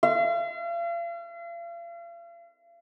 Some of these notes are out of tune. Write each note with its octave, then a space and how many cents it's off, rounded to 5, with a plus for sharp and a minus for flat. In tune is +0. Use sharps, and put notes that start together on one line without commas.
F5 -40